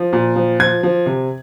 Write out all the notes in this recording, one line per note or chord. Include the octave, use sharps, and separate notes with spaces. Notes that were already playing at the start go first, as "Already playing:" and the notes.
Already playing: F3
A#2
F3
F3 G#6
F3
C3